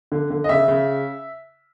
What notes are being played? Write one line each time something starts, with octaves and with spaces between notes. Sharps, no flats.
D3
D3
D#5
C#3 E5
C#3